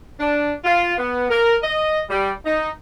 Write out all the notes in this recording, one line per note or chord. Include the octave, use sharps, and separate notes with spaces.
D4
F4
B3
A#4
D#5
G3
D#4